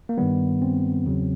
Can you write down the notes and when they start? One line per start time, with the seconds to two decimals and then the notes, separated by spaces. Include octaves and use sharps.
0.09 A#3
0.18 G2 D#3 G3 B3
0.62 C4
1.05 E2 C#3 F#3